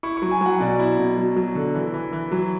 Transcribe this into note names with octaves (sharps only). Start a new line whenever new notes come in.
E4 C#6
F#3 C#6
G#5
F#3 F#5
B2 D5
E4
B2
F#3
F#3
D3
E3
E3
E3
F#3